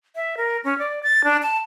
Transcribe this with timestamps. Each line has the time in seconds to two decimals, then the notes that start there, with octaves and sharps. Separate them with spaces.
0.16 E5
0.37 A#4
0.64 C#4
0.78 D5
1.03 A6
1.24 D4
1.42 A5